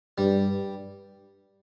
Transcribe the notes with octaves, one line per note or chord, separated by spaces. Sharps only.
G2 G3